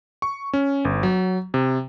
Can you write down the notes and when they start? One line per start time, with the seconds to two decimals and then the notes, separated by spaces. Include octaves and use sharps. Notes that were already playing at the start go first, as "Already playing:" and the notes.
0.22 C#6
0.53 C#4
0.85 G1
1.03 F#3
1.54 C3